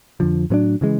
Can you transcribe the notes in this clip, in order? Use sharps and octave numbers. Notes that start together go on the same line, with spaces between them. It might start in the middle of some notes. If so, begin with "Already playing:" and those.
F2 D3 F3
A2 F#3 B3 D4
C#3 E3 G#3